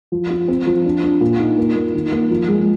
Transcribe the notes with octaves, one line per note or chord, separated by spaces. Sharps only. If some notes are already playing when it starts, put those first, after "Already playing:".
F3
F4
C4
F3
D4
D4
A#2
D#4
A#3
A#3
D#3
A#3
F3
G#3